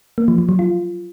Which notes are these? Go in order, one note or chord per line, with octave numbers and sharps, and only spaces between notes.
A#3
F3
F3
F#3
F4